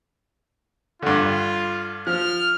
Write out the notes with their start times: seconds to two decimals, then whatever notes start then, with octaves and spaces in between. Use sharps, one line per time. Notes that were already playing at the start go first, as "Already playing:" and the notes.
1.02 G2 D3 F4
2.07 F3 F6